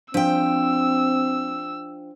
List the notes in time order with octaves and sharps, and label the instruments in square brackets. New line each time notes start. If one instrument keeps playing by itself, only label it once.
[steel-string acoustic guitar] F3 G5 [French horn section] C4 [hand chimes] D4 C5 [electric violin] E6